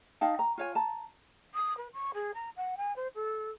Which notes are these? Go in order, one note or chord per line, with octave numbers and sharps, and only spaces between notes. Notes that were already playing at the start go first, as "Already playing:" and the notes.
D#4 F5 G5 A5
A#5
F4 C#5 G#5
A5 A#5
D#6
B4
C#6
G#4
A#5
F#5
G#5
C5
A4